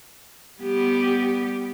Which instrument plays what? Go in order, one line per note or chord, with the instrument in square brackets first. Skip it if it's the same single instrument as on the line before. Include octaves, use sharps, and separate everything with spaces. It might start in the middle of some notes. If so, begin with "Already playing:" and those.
[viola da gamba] G3 B3 G4